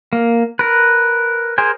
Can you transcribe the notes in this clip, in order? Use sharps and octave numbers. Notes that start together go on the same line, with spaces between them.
A#3
A#4 B4
G#4 A#4 C5 G#5